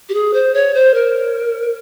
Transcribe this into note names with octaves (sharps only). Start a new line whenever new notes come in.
G4
G#4
C5
C#5
C5
A#4